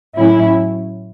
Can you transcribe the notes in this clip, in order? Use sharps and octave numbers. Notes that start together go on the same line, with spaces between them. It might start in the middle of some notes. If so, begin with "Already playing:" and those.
A2 F#3 C#4 E4